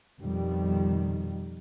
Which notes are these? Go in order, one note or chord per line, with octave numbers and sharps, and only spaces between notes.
F2 B2 D#3 G3